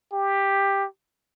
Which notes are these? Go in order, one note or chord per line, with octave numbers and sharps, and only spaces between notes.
G4